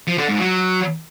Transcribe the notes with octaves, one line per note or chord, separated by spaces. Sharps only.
F3
D3
G#2
F#3